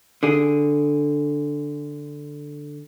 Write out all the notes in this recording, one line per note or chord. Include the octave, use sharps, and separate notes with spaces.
D3 G#4